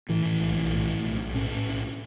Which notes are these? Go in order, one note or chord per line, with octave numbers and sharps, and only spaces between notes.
A2 E3
A2
B1
B1
A2
A2
B1
B1
A2 C#4
A2
B1